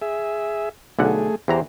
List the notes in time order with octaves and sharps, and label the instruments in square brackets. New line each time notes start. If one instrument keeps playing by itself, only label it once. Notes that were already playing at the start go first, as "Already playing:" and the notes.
[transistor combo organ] G#4 E5
[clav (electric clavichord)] B1 D3 F#5 [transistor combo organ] A3 G#4
[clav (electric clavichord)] E2 E3 A#5 [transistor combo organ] G4 C5